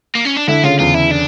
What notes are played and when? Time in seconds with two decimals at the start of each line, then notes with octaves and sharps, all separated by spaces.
0.15 A#3
0.25 C#4
0.37 D4
0.48 D3 E4
0.63 C#3 F4
0.79 E2 F4
0.94 E4
1.11 D4